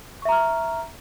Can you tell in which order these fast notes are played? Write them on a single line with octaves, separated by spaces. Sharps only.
C#6 E5 A#5 F6